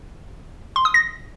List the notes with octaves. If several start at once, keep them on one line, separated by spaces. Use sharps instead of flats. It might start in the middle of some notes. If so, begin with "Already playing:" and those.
C6
D#6
A#6